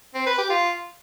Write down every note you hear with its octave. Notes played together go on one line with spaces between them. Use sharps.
C4
B4
G4
F4